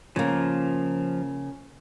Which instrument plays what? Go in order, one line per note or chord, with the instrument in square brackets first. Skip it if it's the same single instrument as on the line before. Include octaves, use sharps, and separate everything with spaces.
[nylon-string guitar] C#3 A#3 [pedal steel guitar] F3 A#4